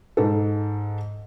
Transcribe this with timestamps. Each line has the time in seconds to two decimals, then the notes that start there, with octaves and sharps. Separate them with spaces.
0.17 G#2 A4